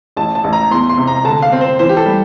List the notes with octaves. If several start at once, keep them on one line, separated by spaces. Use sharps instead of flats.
A1 A5
A5
A1
A#5
E2 C6
C6
C3
A#5
D3 A5
F5
C4
C5
E3 C5
G4
A4
G3